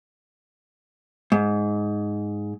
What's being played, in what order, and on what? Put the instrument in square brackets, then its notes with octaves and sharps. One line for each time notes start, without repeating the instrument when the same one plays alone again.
[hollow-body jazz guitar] G#2